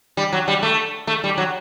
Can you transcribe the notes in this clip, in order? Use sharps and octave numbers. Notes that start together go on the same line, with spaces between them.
G3
F#3
G3
A3
A3
G3
F#3